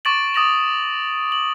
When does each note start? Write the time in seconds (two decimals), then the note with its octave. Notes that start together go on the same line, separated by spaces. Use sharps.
0.05 C#6 D6 A6 D7 F#7
0.34 D6 D#6 A6 A#6 F7 F#7
1.32 F#7